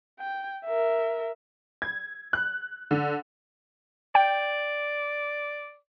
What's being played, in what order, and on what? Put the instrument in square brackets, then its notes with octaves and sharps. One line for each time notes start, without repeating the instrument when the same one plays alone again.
[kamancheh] G5
A#4 E5
[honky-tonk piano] G#6
F#6
D3
[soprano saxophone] D5 [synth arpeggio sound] G5